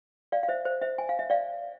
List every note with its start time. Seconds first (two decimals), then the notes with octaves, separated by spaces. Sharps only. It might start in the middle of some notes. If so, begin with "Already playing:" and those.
0.32 D5 F5
0.43 F5
0.48 C5 E5
0.65 C5
0.81 C5 E5
0.98 G#5
1.09 F5
1.19 E5
1.30 D5 F5